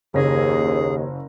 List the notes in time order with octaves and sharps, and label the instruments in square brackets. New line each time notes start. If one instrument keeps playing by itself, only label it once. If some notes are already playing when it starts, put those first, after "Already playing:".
[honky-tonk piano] F#1 C#5 A#6 [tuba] D#2 [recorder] G#4